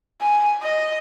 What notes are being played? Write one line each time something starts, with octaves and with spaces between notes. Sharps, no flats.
G#5
D#5